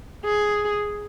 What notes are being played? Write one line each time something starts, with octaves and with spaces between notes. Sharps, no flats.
G#4